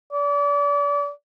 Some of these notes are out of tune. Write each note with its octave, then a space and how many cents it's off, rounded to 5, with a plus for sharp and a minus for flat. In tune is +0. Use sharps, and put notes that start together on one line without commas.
D5 -35